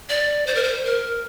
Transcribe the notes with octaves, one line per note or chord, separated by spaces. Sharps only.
D5
C5
A#4
C5
A#4